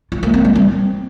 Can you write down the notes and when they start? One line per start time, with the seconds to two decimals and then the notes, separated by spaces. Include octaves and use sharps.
0.12 F4
0.23 A#3
0.34 C4
0.45 G3
0.56 C4